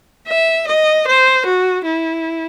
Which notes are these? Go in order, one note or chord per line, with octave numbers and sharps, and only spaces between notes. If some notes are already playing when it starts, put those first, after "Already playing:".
E5
D#5
C5
F#4
E4